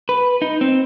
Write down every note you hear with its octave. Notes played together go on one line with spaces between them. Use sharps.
B4
D#4
C4